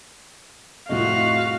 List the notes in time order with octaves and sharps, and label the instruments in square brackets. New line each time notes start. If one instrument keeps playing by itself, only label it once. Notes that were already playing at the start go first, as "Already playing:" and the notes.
[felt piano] C2 F2 A2 [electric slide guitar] F4 G#4 D#5 [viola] F#4 [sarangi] F5